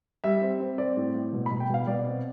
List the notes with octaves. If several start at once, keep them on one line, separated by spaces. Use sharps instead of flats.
G3 E5
C4
C4
C4 D5
A2
A2
B2
B5
B2
G5
B2 F5
B2 D5
C4